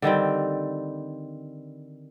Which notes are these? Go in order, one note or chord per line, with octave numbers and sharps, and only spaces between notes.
D3 D#3 G3 C4